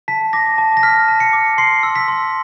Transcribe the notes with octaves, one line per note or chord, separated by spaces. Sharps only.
A5 B6
D6 A#6
A5
A#6
F6 B6
A5
C#7
D6
C6 C7
E6
B6
C6